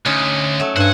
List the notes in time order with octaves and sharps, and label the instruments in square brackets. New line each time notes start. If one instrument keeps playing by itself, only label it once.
[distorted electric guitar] D2 [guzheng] C#4 D#4
[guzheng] F#3 A3
[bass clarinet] G2 [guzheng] C5 G#5 [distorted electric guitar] F#5